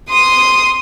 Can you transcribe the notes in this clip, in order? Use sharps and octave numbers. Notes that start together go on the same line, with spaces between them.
C6 D#6